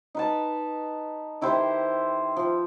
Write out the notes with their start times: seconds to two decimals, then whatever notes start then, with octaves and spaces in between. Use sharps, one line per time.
0.15 D#4 B4 A5
1.41 D#3 E4 G4 C5
2.37 F3